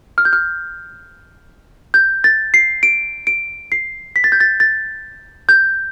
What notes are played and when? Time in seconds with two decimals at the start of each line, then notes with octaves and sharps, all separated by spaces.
0.18 F6
0.25 G6
0.33 F6
1.94 G6
2.24 A6
2.54 C7
2.83 D7
3.27 D7
3.72 C7
4.16 B6
4.24 A6
4.32 G6
4.40 A6
4.60 A6
5.49 G6